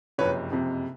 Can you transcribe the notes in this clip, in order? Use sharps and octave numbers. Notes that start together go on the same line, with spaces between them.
F#1 F2 C3 B4 C#5
F#1 F2 C3